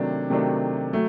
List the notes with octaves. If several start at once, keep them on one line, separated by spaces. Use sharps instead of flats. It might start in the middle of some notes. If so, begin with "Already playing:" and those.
Already playing: C3 D#3 F#3 A3 D4
C3 D#3 F#3 A3 D4
F#3 A3